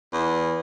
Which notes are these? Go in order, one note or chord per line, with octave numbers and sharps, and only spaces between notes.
E2